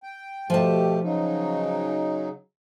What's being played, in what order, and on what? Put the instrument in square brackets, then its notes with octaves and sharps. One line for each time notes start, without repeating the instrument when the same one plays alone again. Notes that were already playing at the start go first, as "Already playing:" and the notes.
[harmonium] G5
[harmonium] B2 A3 G4 [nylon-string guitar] F3 A5
[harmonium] C#3 F#3 D#4